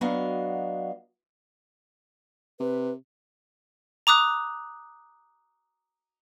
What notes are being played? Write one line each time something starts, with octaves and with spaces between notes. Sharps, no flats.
F#3 B3 D4 F#4 D#5 F5
C3 B4
A#5 D6 D#6 F#6